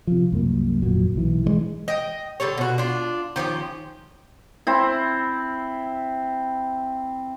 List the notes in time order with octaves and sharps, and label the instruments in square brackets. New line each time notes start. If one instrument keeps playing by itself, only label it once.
[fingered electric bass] C3 F3
C2 F#2 G#3 A#3
G1 F2 A#2 F#3
B1 E3
E3 F3 G#3
[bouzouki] D#5 G5
D3 G3 A4 C#5
B2 F#4
D4 F4
D#3 F3 C#4 G4
[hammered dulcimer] C4 E4